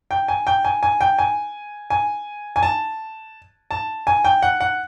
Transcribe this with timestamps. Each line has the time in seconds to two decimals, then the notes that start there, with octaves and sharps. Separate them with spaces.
0.11 G5
0.28 G#5
0.47 G5
0.65 G#5
0.83 G#5
1.01 G5
1.19 G#5
1.90 G#5
2.56 G#5
2.63 A5
3.71 A5
4.07 G#5
4.25 G5
4.42 F#5
4.60 F#5